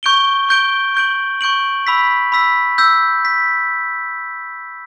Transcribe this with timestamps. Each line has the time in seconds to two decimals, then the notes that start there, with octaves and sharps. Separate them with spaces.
0.03 C#6 G6 D7 G7
0.49 C#6 G6 D7 G7
0.95 C#6 G6 D7 F#7
1.41 C#6 G6 D7 F#7
1.87 B5 E6 B6
2.32 B5 E6 B6
2.78 E6 G6 B6
3.25 B6